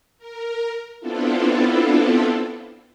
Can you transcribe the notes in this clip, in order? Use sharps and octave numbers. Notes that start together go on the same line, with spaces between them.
A#4
B3 C4 D4 E4 F4 A4